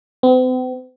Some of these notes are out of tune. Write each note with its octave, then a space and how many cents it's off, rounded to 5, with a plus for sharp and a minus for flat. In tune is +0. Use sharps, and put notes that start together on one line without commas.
C4 -45